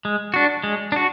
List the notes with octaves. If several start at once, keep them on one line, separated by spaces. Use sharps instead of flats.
G#3
D4 F#4
G#3
D4 F#4